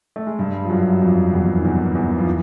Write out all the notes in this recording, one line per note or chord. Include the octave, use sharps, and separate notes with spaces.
A3
G#3
G2 G3
F3
F#2 F#3
F2 F3
E2 E3
D#3
E2 E3
E2 E3
F3
E3